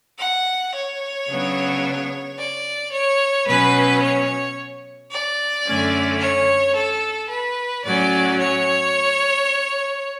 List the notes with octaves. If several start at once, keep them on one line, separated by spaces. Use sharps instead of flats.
F#5
C#5
C#3 F#3 B3 D4
D5
C#5
B2 F#3 C#4 B4
C#5
D5
F#2 D3 A3 C#4
C#5
A4
B4
A2 F#3 C#4 D5
C#5